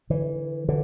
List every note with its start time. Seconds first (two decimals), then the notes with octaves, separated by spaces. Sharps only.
0.10 D3 E3
0.69 D3 E3